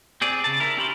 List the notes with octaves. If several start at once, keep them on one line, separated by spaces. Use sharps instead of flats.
C4 G#4 D5
C#3 A5
E4 A#4
C#4 G4 B5 C6